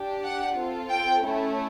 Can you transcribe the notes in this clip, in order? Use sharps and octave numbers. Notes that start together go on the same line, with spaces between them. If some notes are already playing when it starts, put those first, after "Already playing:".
Already playing: D4 G4
F#5
C4 F4 A4
G5
A3 C#4 E4